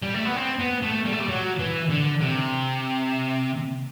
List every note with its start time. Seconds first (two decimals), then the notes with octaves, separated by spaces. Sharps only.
0.02 G3
0.14 A3
0.25 B3
0.36 C4
0.59 B3
0.82 A3
1.05 G3
1.12 A3
1.19 G3
1.29 F#3
1.59 E3
1.90 D3
2.21 C3